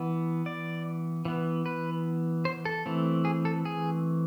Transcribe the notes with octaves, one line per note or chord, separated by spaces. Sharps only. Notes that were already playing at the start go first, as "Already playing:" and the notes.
Already playing: E3 B3
D5
E3 B3
B4
C5
A4
E3 A3 C4
G#4
A4
G#4